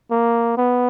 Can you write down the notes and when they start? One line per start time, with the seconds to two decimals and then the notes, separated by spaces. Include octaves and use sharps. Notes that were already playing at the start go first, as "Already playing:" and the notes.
0.11 A#3
0.58 B3